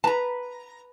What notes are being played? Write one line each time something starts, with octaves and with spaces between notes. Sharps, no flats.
B4 A5 A#5